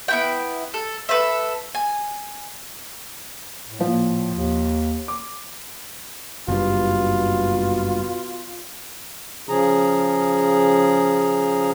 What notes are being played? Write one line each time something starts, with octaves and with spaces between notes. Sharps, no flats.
B3 E4 G5
A4
A4 B4 C5 E5
G#5
A2
A#2 F3
D#2
D6
F#1 G2 B2 F4
C#3 F3 G#4 A#5